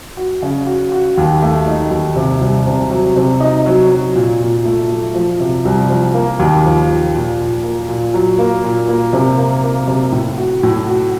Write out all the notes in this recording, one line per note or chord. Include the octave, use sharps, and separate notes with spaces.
F#4
C#3
F#4
F#4
D#2
A3
D#4
D#2
C3
C2
C3
F#3
C3
D#4
F#3
F#3
A#2
A#2
A3
A3
F3
C3
C2
F3
A#3
D#2
F3
F3
A#2
A#2
A#3
A#2
F#3
A#3
A#2
A#3
C3
A#3
A#3
C3
A2
F#4
A2
F#4